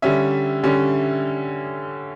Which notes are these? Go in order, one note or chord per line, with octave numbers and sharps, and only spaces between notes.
D3 G3 C#4 E5
D3 G3 C#4